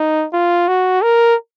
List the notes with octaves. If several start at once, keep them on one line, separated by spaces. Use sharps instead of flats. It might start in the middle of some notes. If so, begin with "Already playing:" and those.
Already playing: D#4
F4
F#4
A#4